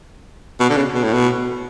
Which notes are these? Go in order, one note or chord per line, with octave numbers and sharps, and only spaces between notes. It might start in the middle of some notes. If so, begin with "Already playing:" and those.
B2
D3
C#3
B2
A2
B2